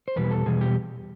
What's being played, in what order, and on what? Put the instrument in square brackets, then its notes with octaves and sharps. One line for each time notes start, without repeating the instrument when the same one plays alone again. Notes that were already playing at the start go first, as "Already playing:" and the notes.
[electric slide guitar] C5
E2 B2 G3 B4
A4
E2 B2 G3 G#4
G4